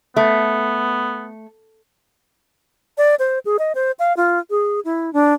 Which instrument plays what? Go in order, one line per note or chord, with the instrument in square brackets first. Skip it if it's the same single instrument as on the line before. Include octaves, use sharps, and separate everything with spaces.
[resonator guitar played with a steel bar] A3 [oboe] B3
[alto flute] D5
C5
G#4
D#5
C5
F5
F4
G#4
E4
D4